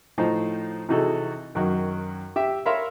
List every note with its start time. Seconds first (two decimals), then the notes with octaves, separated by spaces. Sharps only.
0.18 A2 F3 D#4 C5 A#5
0.89 C3 E3 D#4 F#4 G#4 A4
1.55 F#2 D#3 F#3
2.36 G4 E5
2.66 A#4 C#5 E5 F5 B5 C6